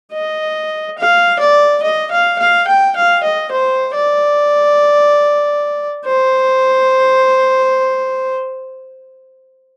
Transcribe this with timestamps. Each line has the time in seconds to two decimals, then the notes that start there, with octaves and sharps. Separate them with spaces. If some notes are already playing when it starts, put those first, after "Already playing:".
0.13 D#5
0.98 F5
1.40 D5
1.83 D#5
2.11 F5
2.39 F5
2.68 G5
2.96 F5
3.24 D#5
3.52 C5
3.95 D5
6.06 C5